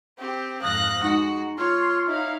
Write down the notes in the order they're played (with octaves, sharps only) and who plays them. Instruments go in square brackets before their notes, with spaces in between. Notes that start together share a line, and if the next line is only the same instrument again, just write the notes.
[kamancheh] C4 G4
[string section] F2 G#2 A#6 [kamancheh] F5 F#6 [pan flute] D#6
[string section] G#3 [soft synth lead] D#4 [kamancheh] F#4 F#5
[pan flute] F4 [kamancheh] C#5 [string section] C6 [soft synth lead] F6
[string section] D#4 C#5 F5 [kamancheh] E4